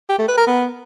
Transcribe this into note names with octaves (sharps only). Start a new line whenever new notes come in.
G4
A3
B4
A#4
B3